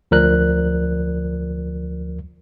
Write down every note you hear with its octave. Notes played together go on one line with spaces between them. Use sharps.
D2 F3 A#4 D5 F#6